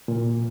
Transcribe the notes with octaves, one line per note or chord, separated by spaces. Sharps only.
A#2